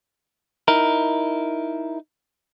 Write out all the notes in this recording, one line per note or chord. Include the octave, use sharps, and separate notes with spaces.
D#4 E4 A#4